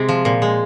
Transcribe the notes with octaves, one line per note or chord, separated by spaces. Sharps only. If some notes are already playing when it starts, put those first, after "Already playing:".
Already playing: C3 G#3
F3
A#2
G#3